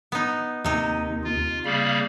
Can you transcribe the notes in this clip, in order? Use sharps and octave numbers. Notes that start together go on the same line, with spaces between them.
B3 D#4
D#2 C3 D#4
F4
C#3 G3 A#3 F5 B5